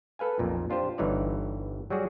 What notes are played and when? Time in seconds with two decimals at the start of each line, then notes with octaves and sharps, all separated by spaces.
0.19 A4 B4 F5 G#5
0.39 B1 F2 A#2
0.70 D4 F4 G4 C5
0.98 G1 G2 E3 D#4 C#5 D5
1.90 F#3 G3 F#4 G#4